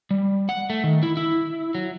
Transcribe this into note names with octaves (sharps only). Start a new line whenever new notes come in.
G3
F#5
A3
D#3
E4
E4
F#3